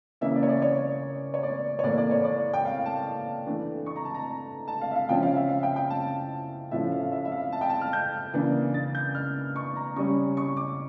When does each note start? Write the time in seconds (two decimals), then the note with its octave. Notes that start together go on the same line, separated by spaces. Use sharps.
0.21 C#3 E3 A#3 C#4 E5
0.35 D5
0.43 C#5
0.49 D5
0.62 C#5
1.34 C#5
1.43 D5
1.79 C#5
1.83 A2 E3 A#3 D5
1.98 D5
2.11 C#5
2.25 D5
2.54 G5
2.65 F5
2.86 A5
3.46 E3 A3 D4
3.86 C#6
3.96 A#5
4.05 A5
4.14 A#5
4.68 A5
4.81 F5
4.91 E5
4.95 F5
5.09 C#3 F3 C#4 G5
5.23 F5
5.36 E5
5.49 F5
5.63 G5
5.76 G5
5.90 A5
6.71 A2 F3 C#4 E5
6.92 F5
7.12 E5
7.25 E5
7.32 F5
7.52 A5
7.61 G5
7.70 A5
7.81 F6
7.93 G6
8.34 C#3 E3 A#3 D4
8.74 A6
8.95 G6
9.15 F6
9.56 C#6
9.76 A#5
9.96 C#3 G3 C#4 C#6
10.37 C#6
10.57 D6